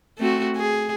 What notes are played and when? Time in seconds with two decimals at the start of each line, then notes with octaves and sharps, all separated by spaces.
0.18 A3 C4 F#4
0.57 G#4